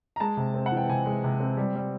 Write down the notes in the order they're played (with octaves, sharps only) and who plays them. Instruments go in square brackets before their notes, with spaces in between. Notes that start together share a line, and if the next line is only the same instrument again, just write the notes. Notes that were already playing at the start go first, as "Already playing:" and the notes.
[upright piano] A#5
G#3 A5
C3
C4
F#5
E3 G5
C3 G#5
G#3
C3
C4
G3
G3